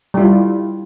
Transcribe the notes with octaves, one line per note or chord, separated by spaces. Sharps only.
G3 E4 F4